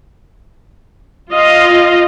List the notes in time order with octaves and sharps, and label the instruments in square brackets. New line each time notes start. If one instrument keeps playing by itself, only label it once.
[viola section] F4 D#5 F5